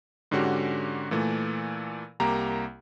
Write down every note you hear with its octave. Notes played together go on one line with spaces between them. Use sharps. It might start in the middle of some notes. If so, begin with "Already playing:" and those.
G#2 D3 C#4 F#4 G4
A#2 E3 A3
C2 A#3 G4 A#5